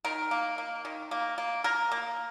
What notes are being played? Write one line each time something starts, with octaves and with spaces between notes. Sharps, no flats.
D#3 A#4
A#3
A#3
D#3
A#3
A#3
A#3 A#4
A#3